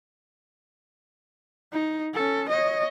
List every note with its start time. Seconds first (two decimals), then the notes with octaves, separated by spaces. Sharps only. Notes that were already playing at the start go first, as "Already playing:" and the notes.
1.72 D#4
2.14 C#4 A4
2.49 C#5 D#5